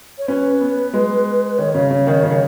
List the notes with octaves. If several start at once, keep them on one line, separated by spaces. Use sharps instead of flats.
C#5
C#4 B4
B3
G#3
D#3 C#5
C#3
C#3
D#3
C#3
D#3